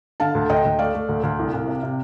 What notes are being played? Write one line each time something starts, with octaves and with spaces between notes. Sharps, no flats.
D3 F5 A5
D2
D2 D#5 G5
D2
A3 D5 F5
A3
D2
D2
C2
C2
C3
C3